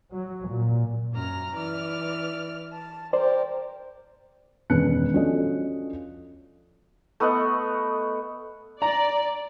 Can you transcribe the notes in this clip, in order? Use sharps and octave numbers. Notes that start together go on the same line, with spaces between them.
F#3
A#2
F#2 A#5 F6
E3 D5 F6
A5
G4 A#4 C5 D5
E1 D#3 C#4 B4 F#6 C#7
F3 C#4 D4 F#4 A4 D#5
A3 B3 D#5 F#5
D5 A#5